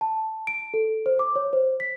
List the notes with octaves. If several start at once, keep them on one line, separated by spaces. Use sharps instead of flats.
A5
D7
A4
C5
D6
C#5
C5
B6